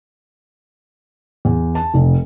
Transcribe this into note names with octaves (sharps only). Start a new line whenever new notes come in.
E2
A5
F1